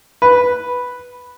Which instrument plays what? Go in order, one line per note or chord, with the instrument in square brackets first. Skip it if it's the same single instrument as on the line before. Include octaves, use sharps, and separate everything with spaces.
[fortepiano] B4